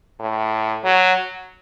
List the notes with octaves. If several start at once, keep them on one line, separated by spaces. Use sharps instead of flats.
A2
F#3